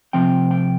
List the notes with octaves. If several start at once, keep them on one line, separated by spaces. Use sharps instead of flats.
C3 F3 C4 G5
G5